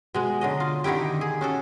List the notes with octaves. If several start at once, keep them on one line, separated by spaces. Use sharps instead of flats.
B2 G#3
D3 F#3 D#5
F4
D3 D#3 D#4 E4 G4
G#4
C#4 F#4 A4